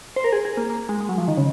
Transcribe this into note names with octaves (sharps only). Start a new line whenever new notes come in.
C5
A#4
G#4
G#4
A#3
A#3
G#3
G#3
F#3
F3
D#3
C#3